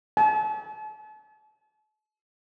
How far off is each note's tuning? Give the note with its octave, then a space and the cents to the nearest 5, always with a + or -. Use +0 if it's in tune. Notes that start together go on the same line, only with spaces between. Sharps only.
A5 -40